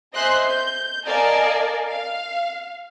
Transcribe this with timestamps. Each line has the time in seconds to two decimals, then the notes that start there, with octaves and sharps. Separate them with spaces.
0.14 C5 D#5 E5 G#5 C6 F#6
0.46 G6
1.06 A#4 D5 D#5 F5 G#5 A5
1.88 F5